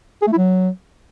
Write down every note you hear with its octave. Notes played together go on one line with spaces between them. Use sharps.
G#4
A3
E4
F#3